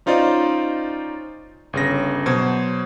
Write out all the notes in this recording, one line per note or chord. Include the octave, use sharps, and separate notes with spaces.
C#4 D#4 F4 C5 D5 D#5
G1 C#3 A#6
B2 F#3 C5 G#6